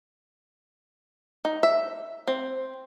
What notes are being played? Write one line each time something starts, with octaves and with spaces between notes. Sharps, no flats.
D#4
E5
C4